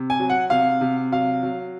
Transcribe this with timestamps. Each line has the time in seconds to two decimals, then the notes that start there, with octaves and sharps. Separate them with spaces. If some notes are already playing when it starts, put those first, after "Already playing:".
Already playing: C3
0.10 G#5
0.20 F#3
0.30 F#5
0.50 C3 F5
0.81 C3
1.12 F#3 F5
1.43 F#3